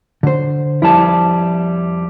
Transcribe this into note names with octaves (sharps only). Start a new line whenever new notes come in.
D3 C5
F2 G3 E4 A5